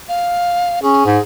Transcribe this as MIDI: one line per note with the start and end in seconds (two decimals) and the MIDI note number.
0.09 0.82 77
0.82 1.03 61
0.82 1.22 68
1.06 1.18 44